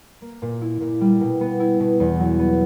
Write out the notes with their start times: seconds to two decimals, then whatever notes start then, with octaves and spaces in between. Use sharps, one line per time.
0.22 A#3
0.42 A#2
0.62 E4
0.81 A#2
1.01 G3
1.21 B2
1.41 B3
1.60 E4
1.80 B2
2.00 E2
2.20 F#3
2.39 B3